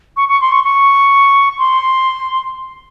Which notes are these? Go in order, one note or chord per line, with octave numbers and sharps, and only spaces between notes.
C#6
C#6
C6
C#6
C#6
C6